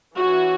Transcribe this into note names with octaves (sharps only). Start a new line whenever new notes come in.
E3 C#4 F#4